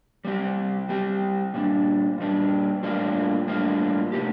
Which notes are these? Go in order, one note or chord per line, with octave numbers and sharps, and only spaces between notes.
G3 C4 G4
G3 C4 G4
A#2 G3 D4
A#2 G3 D4
A2 G3 A#3 D4 F4
A2 G3 A#3 D4 F4
C3 D#3 A3 D#4 G4